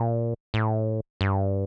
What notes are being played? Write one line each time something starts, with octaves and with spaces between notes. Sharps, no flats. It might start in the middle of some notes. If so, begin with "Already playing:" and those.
Already playing: A#2
A2
G2